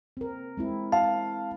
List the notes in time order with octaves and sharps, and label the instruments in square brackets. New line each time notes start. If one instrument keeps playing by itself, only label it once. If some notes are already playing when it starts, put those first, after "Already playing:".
[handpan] C4 A#4
G#3 C4 E4
[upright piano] F5 [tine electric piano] A5